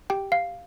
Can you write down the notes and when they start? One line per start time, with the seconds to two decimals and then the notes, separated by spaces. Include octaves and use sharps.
0.10 G4 G5
0.32 F5